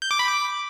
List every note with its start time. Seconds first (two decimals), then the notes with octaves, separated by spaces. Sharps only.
0.02 G6
0.11 D6
0.19 B5
0.28 D6